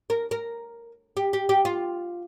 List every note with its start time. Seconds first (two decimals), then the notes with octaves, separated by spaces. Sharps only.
0.10 A#4
0.31 A#4
1.17 G4
1.33 G4
1.49 G4
1.65 F4